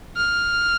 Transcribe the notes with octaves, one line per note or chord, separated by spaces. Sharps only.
F6